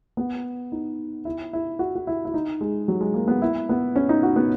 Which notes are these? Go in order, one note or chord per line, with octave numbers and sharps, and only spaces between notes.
B3
D#4
E4
E4
F#4
F#4
E4
E4
D#4
G#3
F#3
G#3
A#3
B3
E4
B3
C#4
D#4
F#4
B3